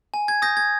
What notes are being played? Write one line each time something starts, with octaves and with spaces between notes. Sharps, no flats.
G#5
G#6
D#6 G6 A#6
G#6